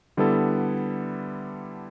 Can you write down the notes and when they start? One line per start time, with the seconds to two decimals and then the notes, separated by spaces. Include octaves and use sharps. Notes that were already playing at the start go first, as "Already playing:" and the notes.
0.17 D3 G3 B3 E4 A4